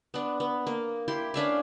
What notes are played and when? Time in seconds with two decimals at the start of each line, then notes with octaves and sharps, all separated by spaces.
0.14 B3 D4
0.40 B3
0.67 A#3
1.08 E4 G4 C6
1.34 C#4 D4 E5 F5